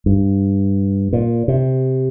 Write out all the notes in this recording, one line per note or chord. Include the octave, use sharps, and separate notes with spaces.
G2
A#2
C3